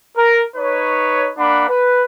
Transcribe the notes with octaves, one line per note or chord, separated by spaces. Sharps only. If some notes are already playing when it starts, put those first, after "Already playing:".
A#4
D#4 B4 C#5
A#3 D4 F#5 B5
B4